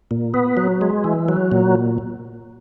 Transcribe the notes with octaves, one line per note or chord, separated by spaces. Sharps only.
A#2
B3
F#3
G#3
E3
F#3
A#2